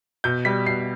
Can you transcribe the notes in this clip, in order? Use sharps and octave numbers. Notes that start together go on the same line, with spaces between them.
B2 G6
G3 B6
B2 C7